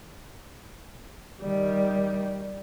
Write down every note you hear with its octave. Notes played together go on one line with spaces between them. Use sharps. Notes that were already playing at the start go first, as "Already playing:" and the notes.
D#3 G3